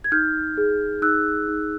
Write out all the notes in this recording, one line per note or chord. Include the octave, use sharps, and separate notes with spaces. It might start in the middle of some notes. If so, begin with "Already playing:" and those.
G#6
D#4 F6 G6
G#4
D#4 E6 F#6
D#4